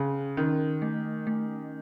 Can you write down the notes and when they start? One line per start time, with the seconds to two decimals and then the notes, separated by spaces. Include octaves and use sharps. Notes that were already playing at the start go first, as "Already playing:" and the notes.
Already playing: C#3 C#4
0.37 D#3 C#4
0.82 A3
1.27 A3